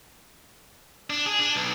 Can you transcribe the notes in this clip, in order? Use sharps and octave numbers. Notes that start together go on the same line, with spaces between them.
D4
G#4
D4
B1